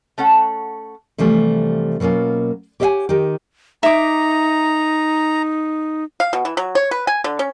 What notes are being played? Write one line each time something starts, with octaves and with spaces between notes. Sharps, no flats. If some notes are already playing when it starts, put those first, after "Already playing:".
A3 C#4 A4 F#5
C3 E3 F3 G3 A3
B2 F#3 A#3 C#4 F4
G4 C#5 D#5 E5 F#5 G#5
D#3 D#4 G4
D#4 E5 A#5 D6
F5
B2
E3
F#3
C#5
B4
G#5
D3
C#4